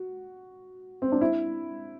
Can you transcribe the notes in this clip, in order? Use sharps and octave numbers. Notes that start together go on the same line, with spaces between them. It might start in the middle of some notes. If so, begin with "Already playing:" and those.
Already playing: F#4
C4
D4
E4